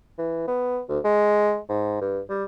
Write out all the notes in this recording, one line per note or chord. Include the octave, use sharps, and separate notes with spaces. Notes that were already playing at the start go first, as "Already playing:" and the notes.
E3
B3
D2
G#3
G#2
G2
G3